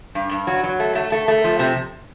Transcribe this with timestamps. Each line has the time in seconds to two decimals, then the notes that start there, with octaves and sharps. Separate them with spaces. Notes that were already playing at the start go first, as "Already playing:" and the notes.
0.15 G2
0.31 G2
0.47 F#3
0.63 F#3
0.80 A3
0.95 A3
1.12 A3
1.28 A3
1.44 F3
1.59 C3